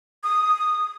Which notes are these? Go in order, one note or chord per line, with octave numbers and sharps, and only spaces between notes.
D#6